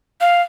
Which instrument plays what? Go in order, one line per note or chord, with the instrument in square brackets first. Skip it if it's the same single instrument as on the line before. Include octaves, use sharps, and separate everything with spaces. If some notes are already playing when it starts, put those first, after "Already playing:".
[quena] F5